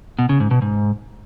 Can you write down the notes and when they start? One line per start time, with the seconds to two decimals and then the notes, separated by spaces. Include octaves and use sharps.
0.19 B2
0.29 C#3
0.40 G#2
0.51 B2
0.62 G#2